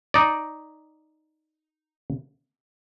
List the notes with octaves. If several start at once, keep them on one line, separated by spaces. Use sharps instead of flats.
D#4 D5